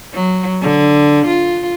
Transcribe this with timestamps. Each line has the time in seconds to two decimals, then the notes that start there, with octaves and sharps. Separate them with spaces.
0.14 F#3
0.61 D3
1.27 F4